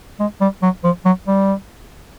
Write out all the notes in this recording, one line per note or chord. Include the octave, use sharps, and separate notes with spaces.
G#3
G3
F#3
F3
F#3
G3